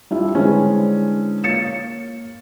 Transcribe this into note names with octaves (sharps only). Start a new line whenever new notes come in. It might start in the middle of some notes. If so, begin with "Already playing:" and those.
G3 D4 E4 F4 G4
D3 E3 G#3 C4 C#4 B4
A#3 C#5 A6 C#7 E7